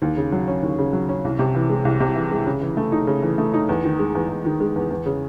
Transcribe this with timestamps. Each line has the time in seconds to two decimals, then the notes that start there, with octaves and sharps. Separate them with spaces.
0.02 D#2
0.17 C#3
0.32 F#3
0.48 C#4
0.63 D#2
0.78 C#3
0.93 F#3
1.09 C#4
1.25 C2
1.39 C3
1.55 E3
1.70 G#3
1.85 C2
2.00 C3
2.16 E3
2.31 G#3
2.46 C#3
2.61 E3
2.77 A3
2.92 D#4
3.07 C#3
3.23 E3
3.38 A3
3.54 D#4
3.69 E2
3.84 D#3
3.99 G#3
4.15 E2
4.29 E2
4.45 D#3
4.60 G#3
4.76 E2
4.90 E2
5.06 C#3